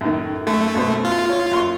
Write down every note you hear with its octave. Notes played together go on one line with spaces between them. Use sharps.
F#2 A2 D#3
F#2 A3
F#2 B2 C5
F4
C#5
F#2 C6 C#6